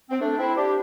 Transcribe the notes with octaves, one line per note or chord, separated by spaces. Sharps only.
C4
A3 D4
C4 E4
D4 G4